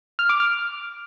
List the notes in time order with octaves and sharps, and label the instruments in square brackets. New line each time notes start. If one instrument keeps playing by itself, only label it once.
[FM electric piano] F6
D6
F6